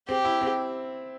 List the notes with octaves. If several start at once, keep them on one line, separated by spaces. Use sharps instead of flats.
C4 G4
E4
C4